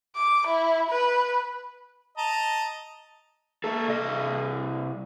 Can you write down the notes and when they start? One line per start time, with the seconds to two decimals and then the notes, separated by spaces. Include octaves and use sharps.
0.15 D6
0.47 E4
0.90 B4
2.18 D#5 A5 A#5
3.64 A#3 A4
3.89 C2 D#5